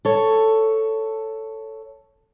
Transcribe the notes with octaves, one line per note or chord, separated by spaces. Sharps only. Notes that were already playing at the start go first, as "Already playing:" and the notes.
A4 C#5